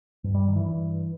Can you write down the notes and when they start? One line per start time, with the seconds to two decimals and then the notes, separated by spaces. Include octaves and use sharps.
0.24 G2
0.35 G3
0.48 D#3
0.56 E3
0.66 G2 E3